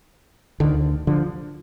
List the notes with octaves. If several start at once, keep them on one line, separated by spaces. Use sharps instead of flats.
D2 D3 D#3
D3 F3